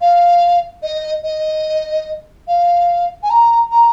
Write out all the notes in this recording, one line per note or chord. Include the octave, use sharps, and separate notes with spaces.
F5
D#5
D#5
F5
G#5
A#5
A#5